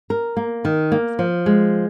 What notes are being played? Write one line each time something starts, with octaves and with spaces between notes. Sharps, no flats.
A#4
A#3
D#3
A#3
F3
G#3